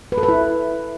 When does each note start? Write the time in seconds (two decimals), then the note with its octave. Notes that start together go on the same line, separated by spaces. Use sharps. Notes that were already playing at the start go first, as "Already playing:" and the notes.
0.12 B4
0.18 A4
0.23 B4
0.29 E4